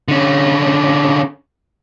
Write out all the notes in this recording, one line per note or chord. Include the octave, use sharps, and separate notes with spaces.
D3 C#4